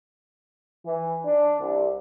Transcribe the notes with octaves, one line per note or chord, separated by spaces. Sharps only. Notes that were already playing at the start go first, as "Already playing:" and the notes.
E3
D4
C2